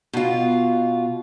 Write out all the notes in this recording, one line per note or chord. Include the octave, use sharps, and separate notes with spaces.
B2 F4